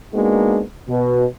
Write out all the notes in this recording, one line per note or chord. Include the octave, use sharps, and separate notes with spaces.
G#3 A#3 B3 D4 D#4 F#4
B2